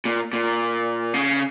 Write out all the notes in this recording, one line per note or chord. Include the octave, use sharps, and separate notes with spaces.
A#2
A#2
C#3